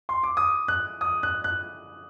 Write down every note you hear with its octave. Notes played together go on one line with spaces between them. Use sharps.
C6
D6
D#6
F#6
D#6
F#6
F#6